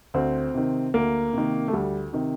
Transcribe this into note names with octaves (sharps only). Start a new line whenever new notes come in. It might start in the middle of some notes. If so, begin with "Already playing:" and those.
D2 C4
C3 D#3
D2 A#3
C3 D#3
A3
D2 G3
C3 D#3